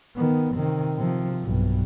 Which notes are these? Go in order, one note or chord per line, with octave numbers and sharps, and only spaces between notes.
D#3 B3
C3 D#3
C3 F3
B1 G2